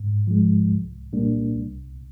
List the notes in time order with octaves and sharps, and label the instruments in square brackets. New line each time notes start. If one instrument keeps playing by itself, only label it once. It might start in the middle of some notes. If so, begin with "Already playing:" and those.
Already playing: [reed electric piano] G#2
F3 G#3
C2
A#2 G3 A#3 D4
C2